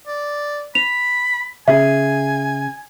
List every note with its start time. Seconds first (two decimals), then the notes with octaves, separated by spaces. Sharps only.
0.07 D5
0.75 B5 F7
1.68 C#3 G#4 E5 G#5